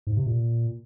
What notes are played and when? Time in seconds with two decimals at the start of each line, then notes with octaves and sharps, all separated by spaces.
0.07 G#2
0.17 C3
0.26 A#2